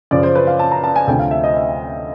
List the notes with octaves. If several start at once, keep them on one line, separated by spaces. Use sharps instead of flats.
F#2 C#3 F3 D5
C5
B4
F5
A5
A#5
A5
G#5
D2 C3 F3 G5
F5
E5
D#5
E5